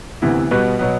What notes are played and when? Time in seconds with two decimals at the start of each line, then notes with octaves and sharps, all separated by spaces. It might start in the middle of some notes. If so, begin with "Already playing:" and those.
0.22 D2 C3 E3 B3 E4
0.51 B2 G3 B3 F#4 B4
0.79 B2 F#3 B3